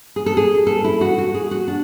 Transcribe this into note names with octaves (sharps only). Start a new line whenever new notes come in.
G#4
A4
G#4
A4
E4
F#4
F#4
G#4
F#4
D4